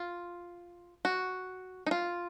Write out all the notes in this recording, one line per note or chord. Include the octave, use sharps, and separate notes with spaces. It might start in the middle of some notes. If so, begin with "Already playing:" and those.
Already playing: F4
F#4
D#4
F4